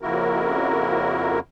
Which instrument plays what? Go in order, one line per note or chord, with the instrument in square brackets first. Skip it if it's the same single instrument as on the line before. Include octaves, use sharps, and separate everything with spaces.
[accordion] F2 C#3 A#3 E4 F#4 A#4